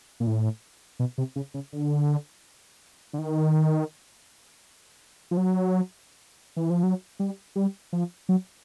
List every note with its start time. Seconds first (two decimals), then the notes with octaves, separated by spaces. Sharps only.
0.20 A#2
0.27 A2
1.00 B2
1.18 C3
1.36 C#3
1.54 C#3
1.73 D3
3.13 D3
3.19 D#3
5.31 F3
5.37 F#3
6.57 E3
6.70 F3
6.83 F#3
7.19 G3
7.56 G3
7.93 F3
8.29 F#3